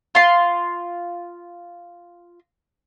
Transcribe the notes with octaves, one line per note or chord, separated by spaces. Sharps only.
F4 C6